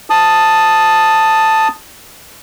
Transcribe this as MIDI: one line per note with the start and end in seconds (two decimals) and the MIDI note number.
0.10 1.68 81
0.10 1.68 87